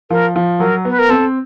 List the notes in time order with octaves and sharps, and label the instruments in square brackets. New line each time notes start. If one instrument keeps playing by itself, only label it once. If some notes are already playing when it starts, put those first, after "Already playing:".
[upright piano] F3 [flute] A#4
[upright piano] F3
[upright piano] F#3 [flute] A#4
[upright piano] B3 [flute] B4
[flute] A#4
[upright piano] C4 [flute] A4